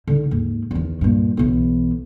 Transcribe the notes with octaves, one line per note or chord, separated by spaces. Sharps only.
D3 D#4
D#2 G#2
E2 D#3
G2 A#2
B1 E3